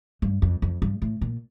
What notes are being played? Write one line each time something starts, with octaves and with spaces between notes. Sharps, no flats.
G2
F2
F2
G2
A2
A#2